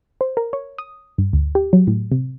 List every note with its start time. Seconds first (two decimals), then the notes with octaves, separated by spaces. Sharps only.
0.21 C5
0.37 A#4
0.53 C#5
0.78 D#6
1.18 G2
1.33 D2
1.55 G4
1.73 F#3
1.87 A2
2.12 C3